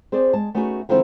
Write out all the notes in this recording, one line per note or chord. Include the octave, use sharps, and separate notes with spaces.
C4 G#4 C5 D5
G#3 A5
A3 B3 C#4 D#4 F#4 G#4
D3 D#3 F3 G#3 C4 E4